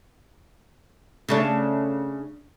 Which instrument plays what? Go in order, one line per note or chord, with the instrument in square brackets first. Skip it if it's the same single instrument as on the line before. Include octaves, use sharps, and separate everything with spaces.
[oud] C#3 A3 D4